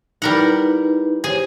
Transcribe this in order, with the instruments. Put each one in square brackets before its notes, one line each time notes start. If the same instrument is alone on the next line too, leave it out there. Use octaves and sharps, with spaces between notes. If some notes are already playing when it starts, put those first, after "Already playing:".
[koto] G3 A#4 F#5 [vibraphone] D#4 E4 B4
[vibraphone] G4 C5 C#5 [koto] G#4